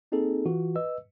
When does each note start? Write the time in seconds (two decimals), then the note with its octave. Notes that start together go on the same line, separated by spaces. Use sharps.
0.12 A#3 C4 D#4 G#4 A4
0.46 E3 F4 F#4
0.75 B4 D#5 E6